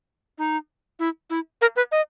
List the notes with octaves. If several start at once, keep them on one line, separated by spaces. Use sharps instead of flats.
D#4
E4
E4
A#4
B4
D#5